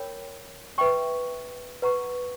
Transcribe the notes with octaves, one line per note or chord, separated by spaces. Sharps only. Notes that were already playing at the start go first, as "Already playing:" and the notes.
Already playing: A#4 C#5 G5 B5
B4 E5 G5 C#6
B4 F#5 A#5 C#6